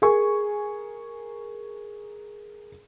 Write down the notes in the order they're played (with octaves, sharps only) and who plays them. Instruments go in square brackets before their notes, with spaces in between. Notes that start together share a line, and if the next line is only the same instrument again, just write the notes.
[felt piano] G#4 A#4 G#5 C#6